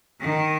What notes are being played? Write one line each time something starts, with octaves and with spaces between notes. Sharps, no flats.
D#3